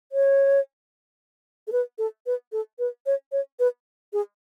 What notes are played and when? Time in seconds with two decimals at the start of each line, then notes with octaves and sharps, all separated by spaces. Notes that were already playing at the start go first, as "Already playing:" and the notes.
0.12 C#5
1.67 A4
1.72 B4
1.98 A4
2.26 B4
2.52 A4
2.79 B4
3.06 C#5
3.32 C#5
3.59 B4
4.13 G#4